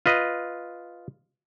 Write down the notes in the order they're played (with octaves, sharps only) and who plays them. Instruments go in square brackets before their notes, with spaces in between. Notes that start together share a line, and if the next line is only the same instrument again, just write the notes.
[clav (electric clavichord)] F4 B4 D#5